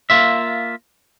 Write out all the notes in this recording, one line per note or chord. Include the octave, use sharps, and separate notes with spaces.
A#3 F4 E5